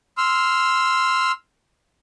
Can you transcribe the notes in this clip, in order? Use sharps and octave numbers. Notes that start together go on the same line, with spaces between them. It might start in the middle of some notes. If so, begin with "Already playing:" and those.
C6 E6 F6